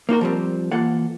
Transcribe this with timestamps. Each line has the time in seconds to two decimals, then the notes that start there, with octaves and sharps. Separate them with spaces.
0.09 A#3 D#4 F#4 A#4
0.21 F3 G3 C4
0.72 E3 A#3 F4 A4 F#5